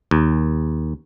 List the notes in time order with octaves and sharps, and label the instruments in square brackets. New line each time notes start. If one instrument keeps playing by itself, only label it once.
[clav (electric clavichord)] D#2